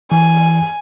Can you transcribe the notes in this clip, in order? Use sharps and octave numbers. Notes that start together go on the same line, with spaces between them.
E3 G#5